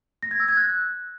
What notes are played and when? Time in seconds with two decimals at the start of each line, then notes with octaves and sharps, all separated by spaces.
0.23 A#6
0.31 G#6
0.40 E6
0.48 G#6
0.57 F#6